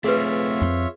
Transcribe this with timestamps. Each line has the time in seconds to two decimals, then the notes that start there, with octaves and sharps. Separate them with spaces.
0.04 A3 C4 F4 G#4 B4 C#5 E5
0.62 F2 C4